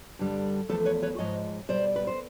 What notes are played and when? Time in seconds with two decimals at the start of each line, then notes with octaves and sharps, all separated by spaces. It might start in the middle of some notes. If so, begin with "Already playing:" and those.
0.19 G2 D3 G3
0.69 E2 C#3 F3 A3 A4 B4
0.85 B4 C#5
1.02 B4 C#5
1.19 G#2 F3 G#3 C#5 D#5
1.69 B2 G3 C5 D5
1.96 B4
2.07 C5